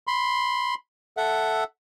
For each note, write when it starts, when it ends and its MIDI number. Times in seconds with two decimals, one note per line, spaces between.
0.07 0.74 83
0.07 0.74 84
1.17 1.64 69
1.17 1.64 76
1.17 1.64 78